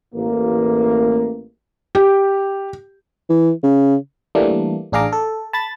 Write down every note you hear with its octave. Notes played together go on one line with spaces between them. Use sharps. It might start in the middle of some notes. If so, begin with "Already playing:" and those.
A1 A#3
G4
E3
C#3
E3 G3 A3 A#3 D4
A1 D4 G#4 F5 A#5 D6
A4
A5 B5 A6